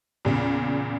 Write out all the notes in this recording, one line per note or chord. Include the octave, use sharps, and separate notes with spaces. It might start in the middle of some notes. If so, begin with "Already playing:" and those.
E2 A#2 C#3